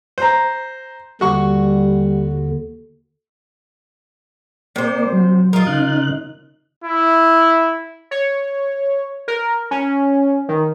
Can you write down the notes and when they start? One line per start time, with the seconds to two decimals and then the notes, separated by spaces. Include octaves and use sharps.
0.18 C5 A#5
1.21 D#2 D3 G3 F#4 C#6
4.76 C3 A#3 C5 D5
5.12 F#3
5.53 F#3 F4 A#4 D#5
5.67 C#3 D#4 F#6
6.84 E4
8.11 C#5
9.28 A#4
9.71 C#4
10.49 D#3